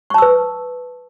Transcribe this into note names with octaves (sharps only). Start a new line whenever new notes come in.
B4 A5 C#6 E6